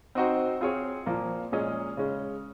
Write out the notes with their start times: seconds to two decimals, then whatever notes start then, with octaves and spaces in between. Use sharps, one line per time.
0.15 C4 D#4 F#4 C5
0.61 C4 F4 G#4 C#5
1.06 A#2 F3 A#3
1.52 A#2 G#3 C#4 G#4 D#5
1.97 C#3 G#3 C#4